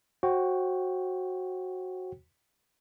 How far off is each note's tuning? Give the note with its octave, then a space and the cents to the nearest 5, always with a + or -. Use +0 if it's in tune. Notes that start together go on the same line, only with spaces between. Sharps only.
F#4 +0 C5 +35 G5 +0